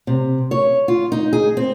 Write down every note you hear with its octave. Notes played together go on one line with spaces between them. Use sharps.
C3
C#5
F4
D#4
G#4
C4